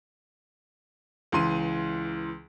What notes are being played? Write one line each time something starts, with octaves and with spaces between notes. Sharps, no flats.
C#2 E3 C6 D#7